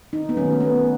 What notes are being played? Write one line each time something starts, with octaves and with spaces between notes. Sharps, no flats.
D#4
B3
D#3 F#3 A3 C#4
B3